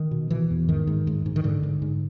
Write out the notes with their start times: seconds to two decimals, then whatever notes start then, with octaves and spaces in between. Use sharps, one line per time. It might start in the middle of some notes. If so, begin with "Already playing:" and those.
Already playing: D#3
0.11 B2
0.31 B2 E3
0.50 E2
0.69 G#2 D#3
0.87 G#2
1.07 G#2
1.26 G#2
1.36 D#3
1.44 G#2 D3
1.63 G#2
1.82 G#2